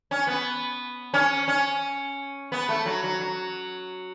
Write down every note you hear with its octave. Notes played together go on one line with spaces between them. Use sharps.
C#4
B3
C#4
C#4
B3
A3
F#3
F#3
F#3